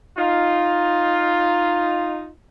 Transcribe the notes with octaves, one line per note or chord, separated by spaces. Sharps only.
D#4 F4